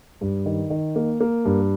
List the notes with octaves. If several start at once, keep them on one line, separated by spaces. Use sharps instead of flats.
G2
D#3
D#3
A#3
A#3
G2